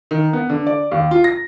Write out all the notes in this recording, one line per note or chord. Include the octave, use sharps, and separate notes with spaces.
D#3
B3
D3
D5
D#2
F4
A#6